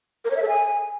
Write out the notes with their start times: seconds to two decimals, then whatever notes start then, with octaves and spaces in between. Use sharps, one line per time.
0.25 A#4
0.31 C#5
0.36 E5
0.42 A4
0.48 G#5